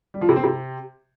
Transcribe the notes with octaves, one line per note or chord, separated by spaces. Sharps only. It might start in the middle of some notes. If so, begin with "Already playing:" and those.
G3
F3
C3
C4
C3